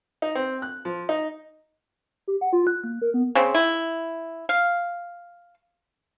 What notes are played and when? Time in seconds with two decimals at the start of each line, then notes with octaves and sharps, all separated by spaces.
0.22 D#4
0.35 C4
0.62 F#6
0.85 F3
1.09 D#4
2.28 G4
2.41 F#5
2.53 F4
2.67 F#6
2.84 A#3
3.02 A#4
3.14 B3
3.35 C#3 C4
3.54 E4
4.49 F5